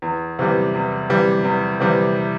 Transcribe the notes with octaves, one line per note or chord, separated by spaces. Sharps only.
E2
C3 E3 G3
E2
C3 E3 G3
E2
C3 E3 G3